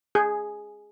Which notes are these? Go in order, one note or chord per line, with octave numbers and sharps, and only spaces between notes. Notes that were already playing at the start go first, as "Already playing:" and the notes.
G#4